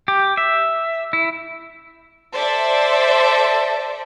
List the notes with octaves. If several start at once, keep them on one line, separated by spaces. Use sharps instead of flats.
G4
E5
E4
A4 C5 D5 E5